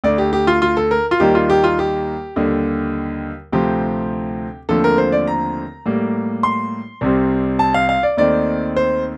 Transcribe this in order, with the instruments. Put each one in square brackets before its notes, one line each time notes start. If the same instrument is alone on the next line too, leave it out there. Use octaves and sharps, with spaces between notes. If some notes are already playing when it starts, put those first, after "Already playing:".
[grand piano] D2 D3 A3 D5
G4
G4
F4
F4
A4
A#4
F4
D#2 D#3 G3 A#3 G4
F4
G4
F4
G4
D#2 D3 G3
D2 C3 F3 C4 G4
D#2 D3 F3 A3 C4 A4
A#4
C5
D5
A#5
A2 G3 A#3
C6
C2 C3 G3 C4
A5
F5
F5
D5
D#2 D#3 A3 C4 D5
C5